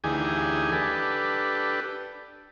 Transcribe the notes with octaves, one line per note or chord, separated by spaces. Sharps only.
D2 E3 D#4 G4 G#4 G#5
D4 G4 A4 B4